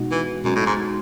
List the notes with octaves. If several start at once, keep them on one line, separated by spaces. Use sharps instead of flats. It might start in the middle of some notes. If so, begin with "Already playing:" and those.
Already playing: B2 G#3 D#4 F#4
E3
F#2 B2 G#3 D#4 F#4
A2
G#2